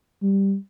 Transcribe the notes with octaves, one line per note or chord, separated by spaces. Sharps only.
G3